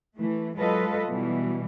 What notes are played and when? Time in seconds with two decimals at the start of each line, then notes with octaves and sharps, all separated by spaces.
0.16 E3 A3
0.56 F#3 G#3 F4 A4 B4 D#5
1.08 B2 E3 G3